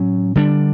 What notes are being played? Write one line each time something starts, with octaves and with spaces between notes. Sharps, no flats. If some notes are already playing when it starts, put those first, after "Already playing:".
Already playing: A2 F#3 C#4
D3 G3 D4